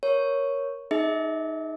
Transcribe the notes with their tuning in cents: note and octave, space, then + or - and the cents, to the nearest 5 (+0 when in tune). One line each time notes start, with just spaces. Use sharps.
A#4 +10 C#5 +0
D#4 +0 G#4 +10 E5 -35